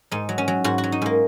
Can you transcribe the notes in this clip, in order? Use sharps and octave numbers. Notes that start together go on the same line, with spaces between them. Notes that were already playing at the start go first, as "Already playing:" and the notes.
G#2 D#4
F#3
C#4
F#3
G#2 F#4
F#4
F#3
D#4
G#2 A#3